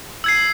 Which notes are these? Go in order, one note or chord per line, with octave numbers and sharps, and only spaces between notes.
E6 G#6 C7